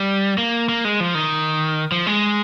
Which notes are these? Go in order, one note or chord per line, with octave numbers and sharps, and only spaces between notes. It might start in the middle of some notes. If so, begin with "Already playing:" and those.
Already playing: G3
A#3
A#3
G#3
F3
D#3
F3
G#3